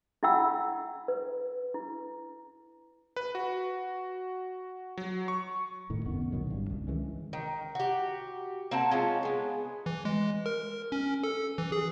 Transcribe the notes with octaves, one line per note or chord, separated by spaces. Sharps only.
E4 F4 F#5 G5 E6
B4
E4
B4
F#4
F#3
C#6
D#1 A2 D#3
C2 F#2 D#3 B3
B2 D#3 F#3
G#1 G2
C#2
D#3 E3 G#3 C#4
D#3
F#4 G4
A#3 C4 F#5 A5
G#3 C#4 F4
G#3 B3
E3
G#3
A#4
C#4
A4
E3
G#4